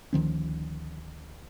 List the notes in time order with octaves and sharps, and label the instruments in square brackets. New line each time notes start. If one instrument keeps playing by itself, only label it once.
[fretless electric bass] D2 D#3 F3 C#4